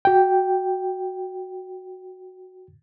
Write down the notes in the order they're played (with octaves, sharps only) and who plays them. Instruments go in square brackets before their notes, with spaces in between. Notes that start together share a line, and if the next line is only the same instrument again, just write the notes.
[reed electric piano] F#4 G5